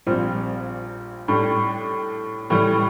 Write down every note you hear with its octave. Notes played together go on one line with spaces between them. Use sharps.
A#1 A#2 G3 C4
A2 G3 D4 G4
A2 E3 G3